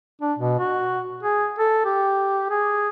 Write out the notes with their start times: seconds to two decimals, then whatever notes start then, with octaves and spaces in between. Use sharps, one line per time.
0.21 D4
0.39 B2
0.59 F#4
1.23 G#4
1.58 A4
1.85 G4
2.50 G#4